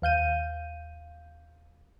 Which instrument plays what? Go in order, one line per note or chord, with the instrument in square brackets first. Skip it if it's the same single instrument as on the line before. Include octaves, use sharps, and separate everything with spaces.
[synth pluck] D#2 F5 G6 D#7